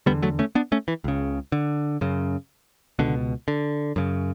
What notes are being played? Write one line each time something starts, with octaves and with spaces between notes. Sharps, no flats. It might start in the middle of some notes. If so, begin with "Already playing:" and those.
E2 D3 G3 B3
F#3 A3
A3 C#4
B3 D4
A3 C#4
E3
C#2 C#3
D3
F#2 C#3
C#2 B2 D3
D3
F#2 C#3